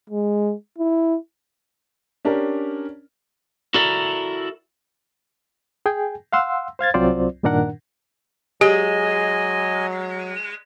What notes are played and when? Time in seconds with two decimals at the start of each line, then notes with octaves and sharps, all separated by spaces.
0.10 G#3
0.78 E4
2.25 C#4 D4 G4 A#4
3.74 E4 F#4 A4 A#4 D5 E5
5.86 G#4 G5 G#5
6.33 F5 F#5 C6 E6
6.79 C5 F5 G#6 A6
6.94 C2 F#3 C4 F4 C5 D5
7.43 G2 A#2 D#3 D4 A#4 F#5
8.61 F#3 G#3 G4 D#5 G#5